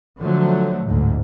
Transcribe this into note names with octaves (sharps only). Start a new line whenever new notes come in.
D3 F3 F#3 A3
A1 D2 G#2